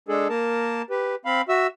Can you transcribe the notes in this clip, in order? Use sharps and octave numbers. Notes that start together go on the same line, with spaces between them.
G#3 D4 G#4 A4
A#3 A#4 A5
G4 B4
C4 F5 B5
F#4 E5 E6